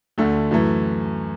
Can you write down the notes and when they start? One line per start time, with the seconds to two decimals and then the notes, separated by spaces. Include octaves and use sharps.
0.18 D2 D3 A3
0.51 F#2 E3 A3